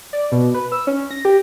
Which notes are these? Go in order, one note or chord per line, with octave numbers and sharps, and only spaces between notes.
D5
B2
B4
E6
C#4
A#6
G4